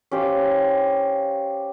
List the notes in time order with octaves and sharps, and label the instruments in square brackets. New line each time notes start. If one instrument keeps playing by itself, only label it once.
[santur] C#4 G4 C5 F5